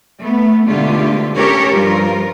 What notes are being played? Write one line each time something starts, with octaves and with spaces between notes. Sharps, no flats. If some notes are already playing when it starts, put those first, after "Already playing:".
A3 B3
G#2 B2 D3 A3 F4 G4
C#4 G4 A4 A#4 C#5
G2 F3 F4 A#4